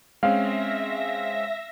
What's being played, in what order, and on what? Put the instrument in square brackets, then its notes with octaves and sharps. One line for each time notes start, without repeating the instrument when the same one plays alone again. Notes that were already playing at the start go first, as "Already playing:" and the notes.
[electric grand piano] G#3 C4 C#4 [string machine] E5 A#6 [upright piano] F5